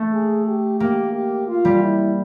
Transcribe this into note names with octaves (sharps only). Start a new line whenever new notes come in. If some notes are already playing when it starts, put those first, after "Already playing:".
Already playing: A3
G#4
G4
A#3 G4
G4
F4
G3
E4